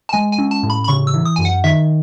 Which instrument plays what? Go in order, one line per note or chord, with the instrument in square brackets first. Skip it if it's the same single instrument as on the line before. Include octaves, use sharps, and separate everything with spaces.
[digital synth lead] A5
[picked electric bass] G#3 [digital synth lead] G#5
[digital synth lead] G#5
[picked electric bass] C#4
[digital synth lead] A5
[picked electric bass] A2
[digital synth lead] B5
B5
[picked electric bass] C#3 [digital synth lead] C#6
[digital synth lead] E6
[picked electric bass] E3
[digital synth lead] D#6
[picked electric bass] F#2 [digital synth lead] G#5
[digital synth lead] F#5
[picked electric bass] D#3 [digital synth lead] E5